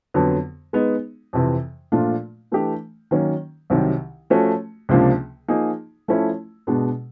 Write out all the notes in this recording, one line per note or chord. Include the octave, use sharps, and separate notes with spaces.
F2 D3 F#3 B3
G#3 B3 D#4
F2 C3 E3
A#2 F3 A3 D4 F4
E3 A3 D4 G4
D#3 F#3 A#3 C#4
C2 C3 D#3 F#3
F3 A3 C#4 F#4
C#2 C3 F3 A#3 D4
F3 A#3 D#4 G#4
F3 A3 C#4 E4
B2 G#3 B3 D4